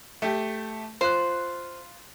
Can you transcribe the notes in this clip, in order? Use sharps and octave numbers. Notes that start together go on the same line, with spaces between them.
A3 G4
F4 C5 C6 F#6